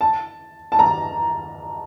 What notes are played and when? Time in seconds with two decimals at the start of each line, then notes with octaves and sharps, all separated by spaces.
0.01 A5
0.72 A5
0.79 A#5